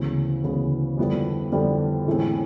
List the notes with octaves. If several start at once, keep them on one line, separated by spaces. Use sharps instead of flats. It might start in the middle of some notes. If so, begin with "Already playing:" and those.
Already playing: D2 C#3 E3 G#3 B3
D2 C#3 E3 G#3 B3
F2 D3 G3 B3 E4
F2 D3 G3 B3 E4
A2 E3 G#3 C4 E4